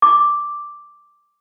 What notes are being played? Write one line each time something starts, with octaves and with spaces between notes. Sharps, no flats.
D6